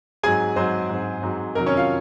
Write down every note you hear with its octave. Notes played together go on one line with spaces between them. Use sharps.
G#2 F#3 C4 G#4 G#5
G#2 F#3 C4 C5
G#2 F#3 C4
G#2 F#3 C4
F2 C3 D#3 F#3 A#4
C#4 C#5
F4 F5